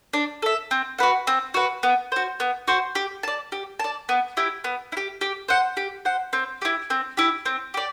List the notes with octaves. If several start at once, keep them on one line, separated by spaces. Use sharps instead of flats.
D4
A4 E5
C4
F#4 B4 F#5
C4
F#4 B4 F#5
B3
F#4 C5
B3
F#4 C5
G4
D5 A5
G4
D5 A5
B3
E4 G4
B3
E4
G4
G4
C5 F#5
G4
C5 F#5
C4
E4 G4
C4
E4 G4
C4
G4 D5